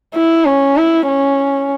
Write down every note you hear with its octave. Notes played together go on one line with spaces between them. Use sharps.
E4
C#4
E4
C#4